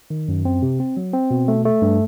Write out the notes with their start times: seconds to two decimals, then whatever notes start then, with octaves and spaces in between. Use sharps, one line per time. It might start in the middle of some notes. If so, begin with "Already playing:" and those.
0.10 D#3
0.28 F#2
0.45 C4
0.62 C3
0.80 C4
0.97 F#3
1.13 C4
1.31 B2
1.48 A3
1.65 A3
1.82 G2